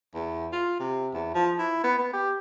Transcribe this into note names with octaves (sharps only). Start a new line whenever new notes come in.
E2
F4
C3
E2
F3
E4
B3
B3
G4